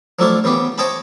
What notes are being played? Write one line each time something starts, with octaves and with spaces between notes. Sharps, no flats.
F3 F#3 A3 D4 E4 F4
C#3 E3 B3 G4
C5 C#5 D#5 G5 A5 B5